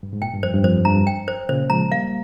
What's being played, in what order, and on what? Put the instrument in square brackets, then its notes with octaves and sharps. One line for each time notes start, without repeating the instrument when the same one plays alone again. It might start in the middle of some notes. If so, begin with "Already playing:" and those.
[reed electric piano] G2
G#2
[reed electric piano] A#2 [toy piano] G5
[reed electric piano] G2
[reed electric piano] F2 [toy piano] C5
[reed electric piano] G2
[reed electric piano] F2 [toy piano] C5
[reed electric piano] G2 [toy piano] A#5
[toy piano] G5
C5
[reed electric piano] A#2 C#3 [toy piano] C5
[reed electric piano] F3 G#3 [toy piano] A#5
[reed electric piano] G3 A#3 [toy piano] F5